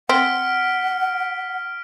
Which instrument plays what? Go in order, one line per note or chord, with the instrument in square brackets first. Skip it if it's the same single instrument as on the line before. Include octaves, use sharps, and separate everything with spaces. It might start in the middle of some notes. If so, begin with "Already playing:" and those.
[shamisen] C4 [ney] F#5 [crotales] F6 B6 D7